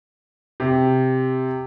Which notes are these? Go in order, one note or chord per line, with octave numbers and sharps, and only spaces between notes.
C3